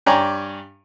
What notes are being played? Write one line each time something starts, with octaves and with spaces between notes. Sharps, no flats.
G2 G4 C#5 D5 G#5 A#5